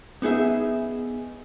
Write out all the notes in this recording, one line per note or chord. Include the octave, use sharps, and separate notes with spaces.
B3 D#4 G#4 E5